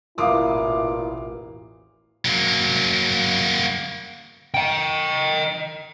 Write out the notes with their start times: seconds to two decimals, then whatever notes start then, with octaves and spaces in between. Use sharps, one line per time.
0.18 E1 A1 A#2 E4 F5 D6 D#6
2.25 F#3 A#3
4.54 D#5 G5